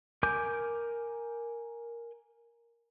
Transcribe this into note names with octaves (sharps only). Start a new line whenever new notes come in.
A#4 G#5 D6 G6